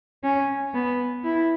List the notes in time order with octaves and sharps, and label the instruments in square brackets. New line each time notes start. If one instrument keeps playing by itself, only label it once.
[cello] C#4
B3
E4